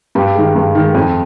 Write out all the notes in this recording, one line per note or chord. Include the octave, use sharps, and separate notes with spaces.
G2 G4
D#3 G#3
G2
D#3 G#3
F2